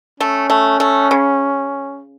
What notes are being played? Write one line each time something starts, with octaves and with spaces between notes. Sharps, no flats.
A3 C#4
A3
A3
C#3